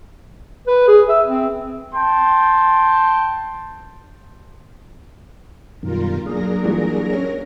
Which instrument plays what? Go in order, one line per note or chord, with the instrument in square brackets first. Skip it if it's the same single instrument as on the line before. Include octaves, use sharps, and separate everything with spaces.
[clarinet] B4
G#4
E5
C4
[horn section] G5 A5 C6
[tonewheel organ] F#2 B2 D#3 [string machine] G3 F4 A#4
[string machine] F#3 A#4 A#6 [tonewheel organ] A#3 D4 G#4
[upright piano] A#2 E3 G3
C#4